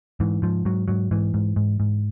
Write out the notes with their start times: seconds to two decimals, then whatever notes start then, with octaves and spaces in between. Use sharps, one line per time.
0.20 G#2 E3
0.42 G#2 F3
0.65 G#2 F#3
0.88 G#2 F#3
1.11 G#2 E3
1.34 G#2
1.56 G#2
1.80 G#2